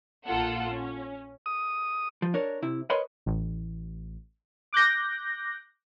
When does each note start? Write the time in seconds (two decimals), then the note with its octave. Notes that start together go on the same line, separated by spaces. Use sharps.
0.27 A#1 A#3 F4 A4 F#5
0.70 C#4
1.46 D#6
2.22 F3
2.34 D4 A#4 C#5
2.62 C3 E4
2.90 A#4 B4 C#5 D#5 B5 C6
3.26 A1
4.73 D6 F#6 G6 A#6